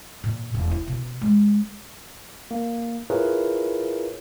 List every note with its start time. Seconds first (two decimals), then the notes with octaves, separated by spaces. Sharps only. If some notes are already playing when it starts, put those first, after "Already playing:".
0.24 A#2
0.54 E1
0.71 E4
0.87 B2
1.22 G#3
2.51 A#3
3.10 E4 F4 G#4 A#4 B4 C#5